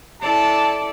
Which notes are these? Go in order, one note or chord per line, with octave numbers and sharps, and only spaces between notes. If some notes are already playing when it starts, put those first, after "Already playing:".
E4 A4 D5 A5